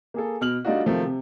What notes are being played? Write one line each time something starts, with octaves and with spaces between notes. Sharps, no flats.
A#3 G#4 A4
B2 F6 F#7
G3 A3 D4 D#4 F4 F#4
C3 D#3 F3 F#3 A3
C3